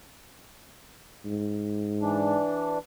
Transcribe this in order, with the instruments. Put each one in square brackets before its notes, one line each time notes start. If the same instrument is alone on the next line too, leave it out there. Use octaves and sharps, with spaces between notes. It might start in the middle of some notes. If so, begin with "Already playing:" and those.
[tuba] G#2
[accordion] E3 D4